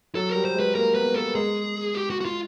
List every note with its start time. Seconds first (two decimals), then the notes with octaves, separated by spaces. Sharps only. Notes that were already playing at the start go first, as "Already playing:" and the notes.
0.15 F#3 A4
0.29 A#4
0.34 G3
0.45 C5
0.54 G#3
0.60 B4
0.75 A#3 A#4
0.95 B3 B4
1.15 A#3 A4
1.35 G#3 G#4
1.95 G4
2.10 F#4
2.21 F#4
2.25 F4